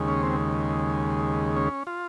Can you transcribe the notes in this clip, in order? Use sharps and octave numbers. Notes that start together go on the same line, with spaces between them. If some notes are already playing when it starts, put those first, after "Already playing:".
Already playing: D#2 C#3 G#3
C#4
C4
C#4
F4